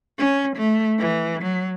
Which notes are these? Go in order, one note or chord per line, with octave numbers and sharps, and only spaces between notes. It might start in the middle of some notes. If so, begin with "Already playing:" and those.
C#4
A3
E3
F#3